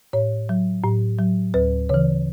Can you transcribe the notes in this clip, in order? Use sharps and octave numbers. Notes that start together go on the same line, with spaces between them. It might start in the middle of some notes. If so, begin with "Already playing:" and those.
A2 C#5
F#3
A2
F#3
D2 B4
C#3 E3 C#5